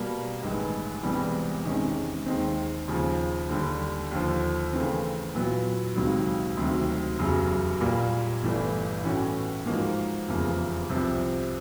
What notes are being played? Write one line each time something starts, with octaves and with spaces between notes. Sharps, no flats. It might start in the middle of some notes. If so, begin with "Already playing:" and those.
Already playing: B2 G3 A#3
A1 G2 D#3 G#3 B3
E1 E2 C3 E3 G3
E2 C3 D#3 G#3 C#4
D#2 D#3 G#3 C4
D#2 C#3 F3
D#2 D3 G3
D#2 D3 F3
D#2 C#3 E3 A3 C4
A#2 F#3 B3 E4
C#2 C3 D#3 F#3
D2 C3 D#3 F#3
F1 E2 C#3 F#3
A#2 G3 A#3
G1 G2 E3 A3 D4
A2 E3 A3 C#4 F#4
G#2 F3 A#3 D#4 F#4
F1 E2 C#3 F3 A#3
C2 C3 F3